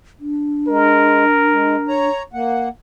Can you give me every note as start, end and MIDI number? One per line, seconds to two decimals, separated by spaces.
0.20 2.09 62
0.68 1.24 56
0.68 2.00 70
1.52 1.76 56
1.88 2.23 73
1.88 2.23 82
2.33 2.69 58
2.33 2.69 78